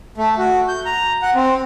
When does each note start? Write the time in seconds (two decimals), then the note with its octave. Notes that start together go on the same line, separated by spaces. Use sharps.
0.18 A3
0.38 F#4
0.68 G6
0.85 A#5
1.22 F#5
1.35 C4